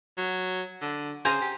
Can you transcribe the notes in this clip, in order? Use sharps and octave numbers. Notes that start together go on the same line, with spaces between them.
F#3
D3
C#3 C5 G#5 A#5
G4